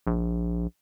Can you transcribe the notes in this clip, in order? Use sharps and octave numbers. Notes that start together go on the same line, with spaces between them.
A#1